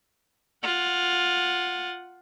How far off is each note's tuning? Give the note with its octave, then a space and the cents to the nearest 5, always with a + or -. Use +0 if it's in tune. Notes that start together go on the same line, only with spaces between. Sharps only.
F4 +10 F#5 +0